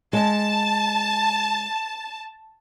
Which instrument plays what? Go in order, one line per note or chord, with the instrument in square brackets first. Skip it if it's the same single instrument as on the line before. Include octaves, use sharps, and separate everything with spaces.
[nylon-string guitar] G#3 [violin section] A5